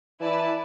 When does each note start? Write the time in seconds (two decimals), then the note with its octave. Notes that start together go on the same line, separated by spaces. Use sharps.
0.20 E3 E4 B4 D5 A5